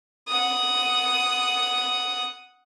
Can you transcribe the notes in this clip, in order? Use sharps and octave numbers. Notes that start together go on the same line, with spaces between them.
F#5 D#6